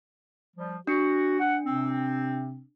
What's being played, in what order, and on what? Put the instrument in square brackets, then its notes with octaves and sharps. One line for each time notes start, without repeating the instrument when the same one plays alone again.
[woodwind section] F3 G3
[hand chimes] D4 C#7 [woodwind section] F#4
[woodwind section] F#5
C3 C4